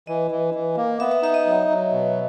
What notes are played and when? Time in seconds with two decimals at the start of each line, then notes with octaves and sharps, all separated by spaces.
0.07 E3 D#5
0.31 E3
0.54 E3
0.76 A#3
1.00 B3 E5
1.11 E5
1.22 D#4 E5
1.34 D#5
1.46 F#3
1.68 F#3
1.92 B2